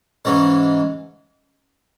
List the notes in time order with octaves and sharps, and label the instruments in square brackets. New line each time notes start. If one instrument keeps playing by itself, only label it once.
[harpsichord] G#2 E3 G#3 C#4